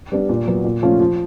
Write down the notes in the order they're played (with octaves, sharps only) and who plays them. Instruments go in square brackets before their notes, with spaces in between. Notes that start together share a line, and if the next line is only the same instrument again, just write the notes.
[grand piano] G3 B3 D4
A#2
F#3 B3
A#2
F3 A3 C#4 F4
F3